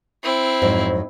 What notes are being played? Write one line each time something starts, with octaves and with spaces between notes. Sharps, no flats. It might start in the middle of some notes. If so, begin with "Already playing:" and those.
C4 E4
F2 G#2 F#3